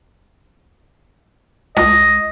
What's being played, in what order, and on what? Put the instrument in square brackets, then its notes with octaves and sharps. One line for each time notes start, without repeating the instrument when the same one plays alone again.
[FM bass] C#2 [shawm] D#5